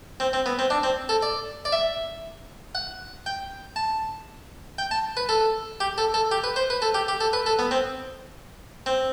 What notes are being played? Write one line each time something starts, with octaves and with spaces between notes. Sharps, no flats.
C4
C4
B3
C4
D4
C4
A4
D5
D5
E5
F#5
G5
A5
G5
A5
B4
A4
G4
A4
A4
G4
B4
C5
B4
A4
G4
G4
A4
B4
A4
B3
C4
C4